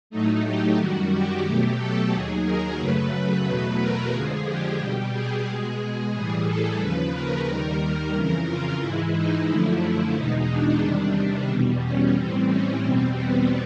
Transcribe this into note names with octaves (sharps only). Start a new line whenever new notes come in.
A2 F#3 A3 D#4
G4
F#2 D#3 G3 F#4
G4
B2 F#3 A3
A4
D#2 D#3 F#3 G#4
A#4
F#2 C#3 F#3 A3 B4
B4
E2 B2 F#3 A3
A#4
F2 D3 F3 G#3 G#4
G4
B2 G3
G#4
B2 G#3
G#4
A2 E3 G3 G#4
A4
D#2 C#3 F3 B4
A#4
D#2 D#3 G3 A#4
F2 C#3 E3 A#4
F4
G#2 E3 G#3 E4
D#4
F#2 D3 F3 A3 E4
E2 B2 G#3 D#4
D4
E2 C3 D#3 G3
E2 B2 G3
C#4
A2 E3 G3 C4
C#4
E2 B2 G3 C4
B3